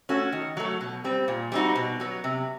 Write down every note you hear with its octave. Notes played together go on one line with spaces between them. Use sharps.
A3 C#4 F#4
D#3
F#3 A3
B2
G3 C4
A#2
G3 C4 D#4 F#4
B2
F#3 B3
C3